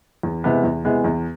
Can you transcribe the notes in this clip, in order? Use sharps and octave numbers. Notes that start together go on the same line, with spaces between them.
E2
C3 E3 G#3 B3
E2
C3 E3 G#3 B3
E2